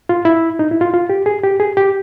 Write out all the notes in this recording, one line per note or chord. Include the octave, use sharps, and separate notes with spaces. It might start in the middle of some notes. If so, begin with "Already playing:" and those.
F4
E4
D#4
E4
F4
F4
G4
G#4
G4
G#4
G4